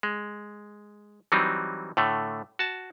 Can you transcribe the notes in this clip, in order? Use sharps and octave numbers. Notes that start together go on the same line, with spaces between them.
G#3
E3 F#3 G3 C4 D#4
A2 D3 A3
F#4 A5